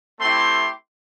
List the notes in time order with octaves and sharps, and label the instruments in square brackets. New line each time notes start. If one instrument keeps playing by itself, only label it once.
[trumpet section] A3 C4 E4 G4 C6